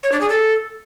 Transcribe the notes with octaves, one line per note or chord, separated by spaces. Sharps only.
C#5
D4
G#4
A4